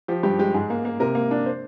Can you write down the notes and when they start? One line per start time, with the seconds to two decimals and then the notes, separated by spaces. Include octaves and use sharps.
0.08 F3 G4
0.23 G2 G4
0.39 G#3 G4
0.54 G#2 G#4
0.70 A#3
0.85 A#3
1.00 C3 A#4
1.15 A#3
1.31 D4
1.46 C5